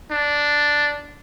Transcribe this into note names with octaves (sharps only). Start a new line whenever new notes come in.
D4